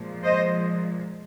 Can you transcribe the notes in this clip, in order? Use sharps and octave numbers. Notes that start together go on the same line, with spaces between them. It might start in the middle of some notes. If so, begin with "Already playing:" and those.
Already playing: A#2 F3 G#3
C5 D#5